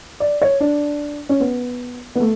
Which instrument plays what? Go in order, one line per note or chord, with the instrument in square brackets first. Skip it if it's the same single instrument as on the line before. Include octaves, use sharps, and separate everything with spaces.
[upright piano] D5
C#5
D4
C#4
B3
B3
A3